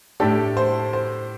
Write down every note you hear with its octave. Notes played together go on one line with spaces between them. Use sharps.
A2 A3 D4 G4 A4
C5
C5